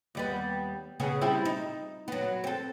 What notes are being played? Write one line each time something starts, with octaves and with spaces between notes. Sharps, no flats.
D#2 G3 B3
C#3 B3 G#4
G3 C4 E4
D#4
F#3 B3
C4 A4